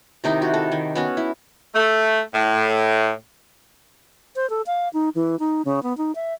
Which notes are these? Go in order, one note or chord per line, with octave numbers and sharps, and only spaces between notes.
C3 D#3 D#4 E4
F#4
A4
D#3
B3 C#4 F#4
E4
A3
A2
C5
A4
F5
D#4
E3
D#4
C#3
B3
D#4
E5